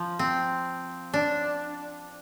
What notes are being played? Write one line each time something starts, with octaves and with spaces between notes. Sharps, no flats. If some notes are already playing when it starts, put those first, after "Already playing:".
Already playing: F3
C4
D4